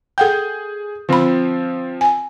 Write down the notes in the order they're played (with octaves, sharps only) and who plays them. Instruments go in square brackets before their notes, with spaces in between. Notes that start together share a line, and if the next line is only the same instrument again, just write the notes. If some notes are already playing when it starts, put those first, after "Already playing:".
[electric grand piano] G#4 G6 [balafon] A4 F#5 G5
[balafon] D3 B5 [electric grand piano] F3 C4 F4
[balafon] G#5